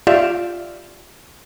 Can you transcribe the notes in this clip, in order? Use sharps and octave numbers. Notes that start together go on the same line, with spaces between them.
F4 G4 D5 E5 F5